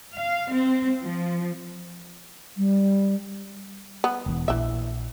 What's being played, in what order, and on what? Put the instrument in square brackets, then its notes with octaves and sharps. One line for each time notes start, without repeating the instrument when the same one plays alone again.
[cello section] F5
C4
F3
[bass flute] G3
[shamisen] B3
[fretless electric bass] E1 E2
[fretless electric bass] A#1 [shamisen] E3 E5